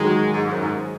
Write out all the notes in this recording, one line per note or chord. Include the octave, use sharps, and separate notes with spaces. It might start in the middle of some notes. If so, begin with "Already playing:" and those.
Already playing: D#3 F#3 G#3 D#4
G#2
F#2
G#2